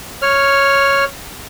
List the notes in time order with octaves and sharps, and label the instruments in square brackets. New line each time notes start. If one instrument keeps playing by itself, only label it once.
[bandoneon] C#5 F6